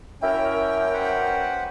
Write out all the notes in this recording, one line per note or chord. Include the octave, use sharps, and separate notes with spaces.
F#2 C#4 E4 A#4 E5 G5
B4 C5 F#5